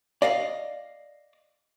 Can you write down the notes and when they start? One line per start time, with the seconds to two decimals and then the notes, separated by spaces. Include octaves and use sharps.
0.22 D5 D#5 F5